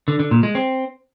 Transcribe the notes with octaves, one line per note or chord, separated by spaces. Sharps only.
D3
D3
A#2
G#3
C4